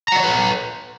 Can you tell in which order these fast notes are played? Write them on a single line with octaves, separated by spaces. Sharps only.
A#5 F#5 D5 C#5 B4